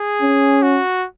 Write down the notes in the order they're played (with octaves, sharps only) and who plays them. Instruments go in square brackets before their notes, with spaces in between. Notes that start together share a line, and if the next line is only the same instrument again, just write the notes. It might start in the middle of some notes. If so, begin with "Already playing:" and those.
Already playing: [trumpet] G#4
[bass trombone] C#4
[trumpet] F#4